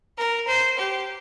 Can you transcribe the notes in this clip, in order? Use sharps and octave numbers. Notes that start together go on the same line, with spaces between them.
A#4
C5
G4